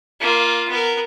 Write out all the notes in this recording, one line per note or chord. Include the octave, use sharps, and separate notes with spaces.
A#3 F4
B3 A#4